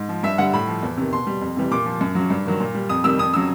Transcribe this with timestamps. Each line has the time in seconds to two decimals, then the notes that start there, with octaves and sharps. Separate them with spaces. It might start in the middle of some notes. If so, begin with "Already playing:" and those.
Already playing: G#2
0.09 F3
0.23 G2 E5
0.38 D3 G3 F#5
0.53 A2 B5
0.67 F3
0.83 E2
0.97 C3 D#3
1.12 B2 C6
1.27 G3
1.41 F2
1.57 C3 E3 G3
1.71 A#2 D6
1.86 F3
2.01 F#2
2.15 C#3 F#3
2.30 G2
2.46 D#3 F#3
2.60 A#2
2.75 G3
2.89 F2 D#6
3.04 C3 D#3 G3 E6
3.19 F2 D#6
3.33 C#3 F#3 E6